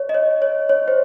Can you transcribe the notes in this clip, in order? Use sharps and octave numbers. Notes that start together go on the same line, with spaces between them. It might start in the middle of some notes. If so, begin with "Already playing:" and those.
Already playing: C#5
D#5
C#5
C#5
C#5
C5